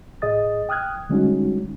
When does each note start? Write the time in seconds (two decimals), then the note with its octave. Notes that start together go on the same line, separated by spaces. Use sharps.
0.22 A2 G#4 D#5 D#6 A6
0.69 G5 D#6 F6 F#6 G#6
1.09 D3 G3 G#3 C#4 D#4 F#4